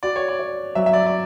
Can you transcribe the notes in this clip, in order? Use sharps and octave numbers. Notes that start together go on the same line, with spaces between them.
F#4 D5
C#5
D5
C#5
F#3 E5
E5
D5
D5